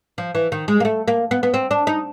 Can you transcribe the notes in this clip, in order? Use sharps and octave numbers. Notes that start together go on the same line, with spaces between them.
F3
E3
D#3
G#3
A#3
A3
A#3
B3
B3
C4
D4
D#4